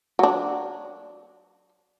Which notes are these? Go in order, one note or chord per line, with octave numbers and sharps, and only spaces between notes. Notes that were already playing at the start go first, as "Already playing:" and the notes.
F#3 D4